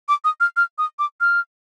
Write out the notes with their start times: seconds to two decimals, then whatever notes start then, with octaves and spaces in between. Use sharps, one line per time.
0.08 D6
0.24 D#6
0.40 F6
0.57 F6
0.78 D#6
0.99 D6
1.21 F6